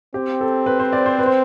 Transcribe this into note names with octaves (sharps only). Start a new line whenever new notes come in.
C4 G4
A4
B4
C5
D5
C5
B4
C5